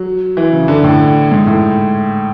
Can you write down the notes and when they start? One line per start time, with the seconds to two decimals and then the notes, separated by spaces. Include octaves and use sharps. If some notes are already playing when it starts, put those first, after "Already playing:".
Already playing: F#3
0.37 E3
0.52 C#3
0.68 D3
0.84 A2
1.32 G#2
1.47 A2